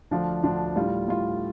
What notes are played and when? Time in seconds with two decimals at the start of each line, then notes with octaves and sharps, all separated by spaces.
0.11 D2 D3 F3 D4 F4
0.43 D2 D3 F3 D4 F4
0.76 A2 G3 F4
1.08 A2 G3 F4